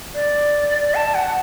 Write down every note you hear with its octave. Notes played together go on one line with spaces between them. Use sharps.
D5
A5
F#5